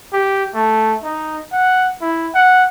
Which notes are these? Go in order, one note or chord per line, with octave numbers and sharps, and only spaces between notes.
G4
A3
D#4
F#5
E4
F#5